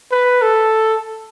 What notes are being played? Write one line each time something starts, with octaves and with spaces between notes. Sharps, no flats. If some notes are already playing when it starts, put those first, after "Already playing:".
B4
A4